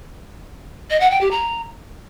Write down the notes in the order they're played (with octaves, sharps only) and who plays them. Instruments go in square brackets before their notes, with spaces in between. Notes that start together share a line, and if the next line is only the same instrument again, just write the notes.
[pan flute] D#5
F#5
G5
G4
A#5